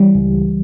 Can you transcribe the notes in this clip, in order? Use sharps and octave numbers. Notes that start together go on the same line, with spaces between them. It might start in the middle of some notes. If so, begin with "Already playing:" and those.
Already playing: E3 G3
C#2